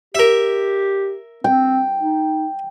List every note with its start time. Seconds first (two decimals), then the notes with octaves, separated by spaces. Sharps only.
0.15 G4 A#4 E5
1.44 C4 G5
2.00 D#4